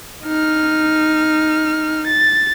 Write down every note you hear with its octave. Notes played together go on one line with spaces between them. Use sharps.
D#4 F6
A6